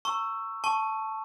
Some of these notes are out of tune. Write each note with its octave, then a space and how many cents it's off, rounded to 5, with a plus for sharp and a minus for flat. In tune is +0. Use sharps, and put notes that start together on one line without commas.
A#5 -40 C#6 +0 E6 +15
A5 +0 C#6 +0